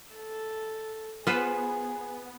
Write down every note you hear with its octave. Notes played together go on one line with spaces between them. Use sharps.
A4
B3 F4 G#4 B4 C5